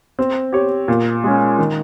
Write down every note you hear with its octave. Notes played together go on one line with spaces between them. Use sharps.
C4
G4 C#5
A#2
G#3 C#4
D#3